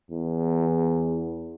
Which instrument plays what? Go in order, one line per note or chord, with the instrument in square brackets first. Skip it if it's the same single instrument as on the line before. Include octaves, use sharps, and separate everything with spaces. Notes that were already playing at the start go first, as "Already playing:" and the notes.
[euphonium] E2